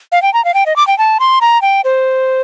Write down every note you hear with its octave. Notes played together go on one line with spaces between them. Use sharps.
F5
G5
A#5
F5
G5
D#5
D6
G5
A5
C6
A#5
G5
C5